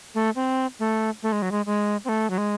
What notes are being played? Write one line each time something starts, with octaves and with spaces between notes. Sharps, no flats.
A3
C4
A3
A3
G#3
F#3
G#3
G#3
C4
A3
F#3
G#3